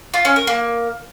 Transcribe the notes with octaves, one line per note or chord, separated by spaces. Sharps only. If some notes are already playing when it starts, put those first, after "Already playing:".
F4
C#4
A#4
A#3